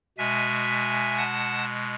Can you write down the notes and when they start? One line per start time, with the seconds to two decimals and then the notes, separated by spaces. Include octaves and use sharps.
0.18 B2 G#3 E5 G#5
1.18 F#5 A5